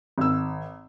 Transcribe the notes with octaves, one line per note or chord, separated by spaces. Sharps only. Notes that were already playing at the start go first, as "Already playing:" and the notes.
G#1 E6